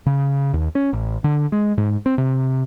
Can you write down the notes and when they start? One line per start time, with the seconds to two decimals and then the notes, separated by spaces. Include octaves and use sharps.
0.06 C#3
0.54 D#2
0.75 C#4
0.93 A1
1.24 D3
1.52 G#3
1.78 G#2
2.06 C4
2.18 C3